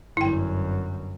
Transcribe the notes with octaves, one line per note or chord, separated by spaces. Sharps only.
G1 F#2 E4 G5